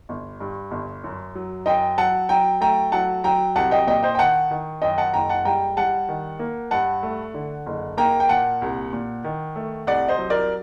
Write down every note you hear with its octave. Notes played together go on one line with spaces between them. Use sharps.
G1
G2
G1
F#2
F#3
F#2 D#5 G5
F#3 F#5 A5
F#3 G5 A#5
A3 G5 A#5
F#3 F#5 A5
F#3 G5 A#5
C2 F#5 A5
D#5 G5
A#2 D#5 G5
C5 D#5
G5
D#3 F#5 A5
D#3
F#2 D#5 G5
F#5 A5
F#1 G5 A#5
F#5 A5
G3 G5 A#5
G3 F#5 A5
D#3
A#3
G2 F#5 A5
A3
D3
F#1
A#3 G5 A#5
G5
A#2 F#5 A5
C2
A#2
D#3
A3
C2 D5 F#5
C5 D#5
F#3
A#4 D5